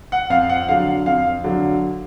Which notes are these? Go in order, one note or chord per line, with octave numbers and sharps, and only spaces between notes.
F#5
F2 F5
F#5
D3 F#3 F5
F2 F5
D3 F#3